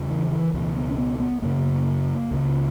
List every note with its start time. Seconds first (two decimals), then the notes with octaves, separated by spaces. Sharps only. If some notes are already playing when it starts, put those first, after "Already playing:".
Already playing: E2 C#3
0.10 E3
0.32 E3
0.54 C#2 B2 E3
0.76 B3
0.91 C#4
0.98 B3
1.20 B3
1.42 F#2 C#3 A#3
2.31 C#2 C#3